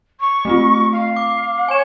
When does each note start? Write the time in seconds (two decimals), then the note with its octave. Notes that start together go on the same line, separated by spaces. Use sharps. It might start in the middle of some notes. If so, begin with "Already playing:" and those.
0.19 C#6
0.45 A3 C4 F4
0.92 F5
1.16 D6
1.68 C#5 G#5 E7